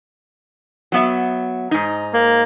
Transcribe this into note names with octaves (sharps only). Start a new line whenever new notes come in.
F#3 B3 E5
G#2 D#4
A#3